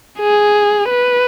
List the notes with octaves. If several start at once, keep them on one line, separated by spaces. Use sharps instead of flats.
G#4
B4